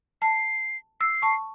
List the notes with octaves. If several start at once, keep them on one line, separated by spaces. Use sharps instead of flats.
A5 C7
E6 C7
A5 C#6